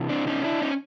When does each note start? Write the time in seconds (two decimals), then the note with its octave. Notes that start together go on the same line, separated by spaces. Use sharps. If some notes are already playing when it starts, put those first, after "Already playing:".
Already playing: C3 E3
0.09 C4 D4
0.27 C#4 D#4
0.44 D4 E4
0.62 C#4 D#4